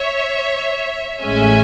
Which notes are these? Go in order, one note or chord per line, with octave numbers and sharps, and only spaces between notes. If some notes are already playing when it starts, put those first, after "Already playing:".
Already playing: C#5 E5
A1 A2 G#3 C#4 E5 G#5